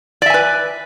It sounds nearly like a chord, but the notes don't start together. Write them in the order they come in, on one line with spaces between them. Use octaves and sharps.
D5 E5 G#5 B4